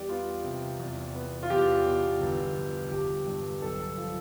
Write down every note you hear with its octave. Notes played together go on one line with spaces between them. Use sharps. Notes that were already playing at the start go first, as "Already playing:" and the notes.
Already playing: E2 G3 G4 D5
B3 F4
C3
E2
B3
F4
E2 G4
B2
G1
F3
G1 G4
G2
B1 A4
F3